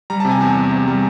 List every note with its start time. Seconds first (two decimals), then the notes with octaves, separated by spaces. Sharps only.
0.10 G3 A#5
0.20 C3 A5
0.31 G#5
0.41 E2 A5
0.56 E2
0.71 C3
0.88 G3